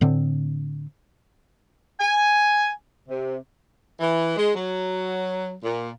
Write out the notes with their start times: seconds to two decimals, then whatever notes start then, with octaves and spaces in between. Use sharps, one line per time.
0.01 A2 D3 C4
2.00 G#5
3.09 C3
4.00 E3
4.36 G#3
4.54 F#3
5.62 A#2